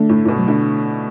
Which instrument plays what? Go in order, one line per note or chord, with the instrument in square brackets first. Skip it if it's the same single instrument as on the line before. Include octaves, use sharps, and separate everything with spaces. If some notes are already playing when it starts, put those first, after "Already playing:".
Already playing: [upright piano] D3 [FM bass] A3
[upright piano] A2
A2
B2
[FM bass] F#3
[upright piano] D3 [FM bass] A3